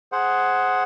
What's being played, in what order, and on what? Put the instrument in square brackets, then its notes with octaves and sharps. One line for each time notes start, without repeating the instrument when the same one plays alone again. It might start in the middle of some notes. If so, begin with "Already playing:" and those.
[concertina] G#4 C5 F#5